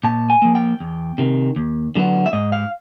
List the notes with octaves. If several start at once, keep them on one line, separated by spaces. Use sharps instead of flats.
A#2 A5
G#5
F3 A#3
G5
E2
C3 D#3
D#2
D3 F#3 B3
E5
G#2 D#5
F5